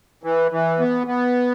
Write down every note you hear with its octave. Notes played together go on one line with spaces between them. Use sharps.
E3
E3
B3
B3